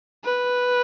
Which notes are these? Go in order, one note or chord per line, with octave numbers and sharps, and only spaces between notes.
B4